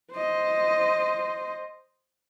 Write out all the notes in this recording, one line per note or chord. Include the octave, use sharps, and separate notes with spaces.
C5 D#5